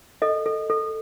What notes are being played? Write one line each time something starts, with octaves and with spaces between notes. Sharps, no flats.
A4 D#5
A4
A4